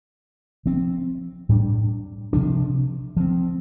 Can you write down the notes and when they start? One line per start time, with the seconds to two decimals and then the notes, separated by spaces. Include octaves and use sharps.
0.66 F3 C4
1.49 A2 G3 D4
2.33 C3 F3 D4
3.17 F3 C4